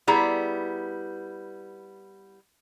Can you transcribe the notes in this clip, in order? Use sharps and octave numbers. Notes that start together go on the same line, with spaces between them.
G3 B3 E4 G#4 A#5